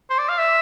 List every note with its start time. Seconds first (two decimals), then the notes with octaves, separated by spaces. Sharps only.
0.10 C5
0.18 D5
0.29 F5
0.38 E5